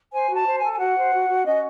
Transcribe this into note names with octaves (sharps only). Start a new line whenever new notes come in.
C5 G#5
F#4
A5
C5
G#5
A4
G#5
F#4 F#5
C5
F#4
F#4
C#4 D#5